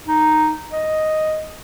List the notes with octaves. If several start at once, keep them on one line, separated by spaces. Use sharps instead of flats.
D#4
D#5